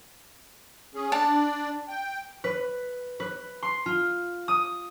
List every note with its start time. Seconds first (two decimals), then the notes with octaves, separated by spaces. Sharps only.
0.94 C#4 G#4
1.12 D4 D5 A5
1.88 G5
2.44 B4
3.20 B4
3.63 C6
3.86 F4
4.48 D#6